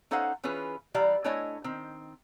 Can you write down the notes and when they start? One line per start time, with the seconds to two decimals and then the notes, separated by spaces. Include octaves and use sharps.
0.11 C#4 D#4 A4 C5 F5 F#5
0.44 E3 C#4 F4 G#4 B4
0.94 E3 G3 D5 F5 A#5
1.24 A3 D4 E4 C#5 D#5 G#5
1.64 D#3 C4